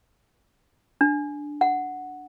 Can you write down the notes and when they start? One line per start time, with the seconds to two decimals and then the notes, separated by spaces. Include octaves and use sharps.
1.01 D4
1.61 F#5